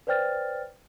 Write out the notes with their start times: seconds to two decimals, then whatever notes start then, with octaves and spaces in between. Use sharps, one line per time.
0.07 B4 C5 D5 G5 F6 A6